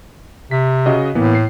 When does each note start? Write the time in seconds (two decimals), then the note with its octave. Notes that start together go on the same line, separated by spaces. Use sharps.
0.51 C3 B6
0.86 C#3 F#4 D#5
1.15 A2 E3 A#3 B3
1.35 C7